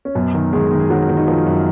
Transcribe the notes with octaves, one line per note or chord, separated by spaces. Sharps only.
C#4
F#2 B2 B3
D#3
D#3 G#3 G#4
D#3
G#4
D#3 F#3 F#4
D#3
D#4
D#3 F3 F4
F#2